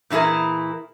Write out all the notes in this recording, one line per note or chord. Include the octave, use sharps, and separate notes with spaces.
A#2 E3 E4 G#4 A#4